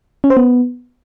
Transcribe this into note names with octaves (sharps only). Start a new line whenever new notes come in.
C#4
C5
B3